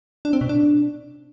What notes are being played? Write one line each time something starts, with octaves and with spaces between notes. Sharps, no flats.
D4
C4
B2
D4